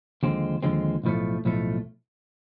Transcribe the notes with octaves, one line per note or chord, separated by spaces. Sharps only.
D#2 D3 F3 G#3 C4
D#2 D3 F3 G#3 C4
B1 A2 F3 A3
B1 A2 F3 A3